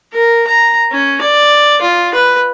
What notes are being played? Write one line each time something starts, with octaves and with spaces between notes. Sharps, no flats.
A#4
A#5
C#4
D5
F4
B4